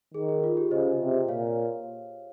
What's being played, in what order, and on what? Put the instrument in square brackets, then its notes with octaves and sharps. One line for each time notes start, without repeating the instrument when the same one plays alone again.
[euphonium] D#3 [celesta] G#4
[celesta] G#4
F4
G4
[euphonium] C#3 [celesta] C5 D#5
[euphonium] C3
[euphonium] A#2 [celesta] C#5 F5